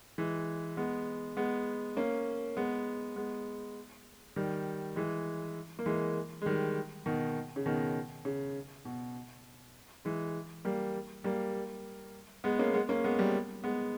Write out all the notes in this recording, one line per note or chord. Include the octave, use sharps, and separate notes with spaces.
E3 G#3
G#3 B3
G#3 B3
A#3 C#4
G#3 B3
G#3 B3
D#3 G3
E3 G#3
A#3
E3 G#3
G#3
D#3 G3
B2 D#3
C#3
B2 D#3
C#3
B2
E3 G#3
G3 A#3
G3 A#3
G#3 B3
A#3 C#4
G#3 B3
A#3 C#4
G#3 B3
G3 A#3
G#3 B3